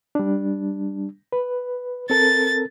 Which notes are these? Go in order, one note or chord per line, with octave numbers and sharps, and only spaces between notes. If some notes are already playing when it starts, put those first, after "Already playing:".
G3 D4
B4
C4 A4 A#4 A6